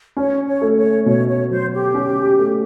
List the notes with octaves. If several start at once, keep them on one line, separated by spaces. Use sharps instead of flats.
C#4 C#5
C#5
A3
C#5
B2 C#5
C#5
F#3 C5
G4
C#4
A3